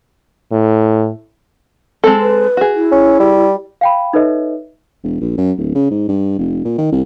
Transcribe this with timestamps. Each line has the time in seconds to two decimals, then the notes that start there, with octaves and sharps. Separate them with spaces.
0.52 A2
2.04 G#3 C4 A4
2.21 B4
2.57 F#4 G#4
2.75 E4
2.91 C#4
3.20 G3
3.81 F5 G5 B5
4.13 D#4 A4 B4 C#5 D#5 E5
5.04 E1
5.21 A#1
5.38 F#2
5.58 D1
5.75 C#3
5.91 G#2
6.08 G2
6.39 F1
6.65 A#2
6.78 D#3
6.92 C2